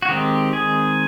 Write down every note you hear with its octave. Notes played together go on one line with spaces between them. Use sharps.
F#4
D#3 G#3 C4 G4
G#4